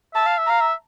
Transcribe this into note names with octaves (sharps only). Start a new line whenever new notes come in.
E5 A5
F5
E5
F5 A#5
E5